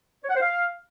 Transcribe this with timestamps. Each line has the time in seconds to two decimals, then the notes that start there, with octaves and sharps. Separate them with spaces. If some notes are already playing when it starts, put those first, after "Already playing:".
0.24 C#5
0.30 F#5
0.36 C5
0.42 F5